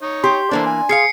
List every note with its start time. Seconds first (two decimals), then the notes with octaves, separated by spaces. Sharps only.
0.02 D#4 C#5
0.24 G4 C6
0.51 E3 A#3 D4 A4 C5 A5
0.66 G#5
0.89 G#4 F5 C7 C#7